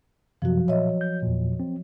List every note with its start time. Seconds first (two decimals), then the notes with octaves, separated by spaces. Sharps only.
0.42 F#2 C3 F3 F#3 F#4
0.68 A#2 C#5 D#5 E5
1.01 G6
1.22 E2 A#2
1.60 C4